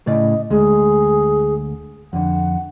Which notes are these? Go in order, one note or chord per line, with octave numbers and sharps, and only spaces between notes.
A2 C#3 D5 D#5
D2 G#3 G#4
F2 D3 F#5